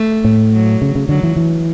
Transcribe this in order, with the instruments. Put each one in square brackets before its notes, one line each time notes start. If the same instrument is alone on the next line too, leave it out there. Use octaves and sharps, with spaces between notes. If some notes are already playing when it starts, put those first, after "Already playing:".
Already playing: [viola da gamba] A3
[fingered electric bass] A2
[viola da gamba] F#3
[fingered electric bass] C#3
C#3
[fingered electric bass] D3 [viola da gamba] F#3
[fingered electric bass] E3
E3